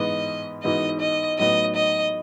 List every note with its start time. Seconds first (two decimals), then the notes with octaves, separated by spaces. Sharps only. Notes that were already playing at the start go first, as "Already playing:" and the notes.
Already playing: G#2 E3 G#3 B3 D#5
0.64 G#2 E3 B3 D#4 F#4 D#5
1.01 D#5
1.39 A2 F#3 B3 D#4 D#5
1.76 D#5